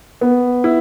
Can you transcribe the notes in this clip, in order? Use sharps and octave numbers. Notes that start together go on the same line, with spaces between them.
B3
E4